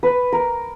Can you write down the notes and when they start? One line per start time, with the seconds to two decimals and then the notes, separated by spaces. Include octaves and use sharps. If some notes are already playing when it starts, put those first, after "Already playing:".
0.03 B4
0.32 A#4